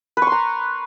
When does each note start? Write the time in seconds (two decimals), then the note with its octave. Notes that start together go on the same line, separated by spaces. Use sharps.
0.17 B4
0.22 C#6
0.27 C6
0.32 A#5